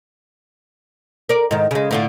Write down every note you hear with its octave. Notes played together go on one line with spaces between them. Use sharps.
A#4 D5
G#2 D#3
C#3 G#3
A2 D3 F4